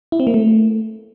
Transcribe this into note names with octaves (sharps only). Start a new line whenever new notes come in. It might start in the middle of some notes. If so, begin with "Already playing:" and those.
E4
C4
A#3
A3